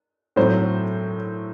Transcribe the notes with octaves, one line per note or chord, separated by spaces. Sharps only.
A2 F#3 C4 C5